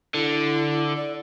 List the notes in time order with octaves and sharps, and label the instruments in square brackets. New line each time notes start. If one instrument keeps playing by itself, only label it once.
[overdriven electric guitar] D3 [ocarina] E4
[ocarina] D5